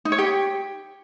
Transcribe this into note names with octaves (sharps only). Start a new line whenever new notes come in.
D#4
C#5
G4